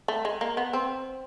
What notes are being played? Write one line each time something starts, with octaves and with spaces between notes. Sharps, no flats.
A3
G#3
A#3
B3
C4